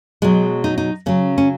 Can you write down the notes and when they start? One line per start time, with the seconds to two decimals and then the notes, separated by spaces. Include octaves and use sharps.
0.22 B2 F#3 G#3
0.64 D#4
0.78 D#4
1.06 C#3 F#3 C#4
1.38 C#4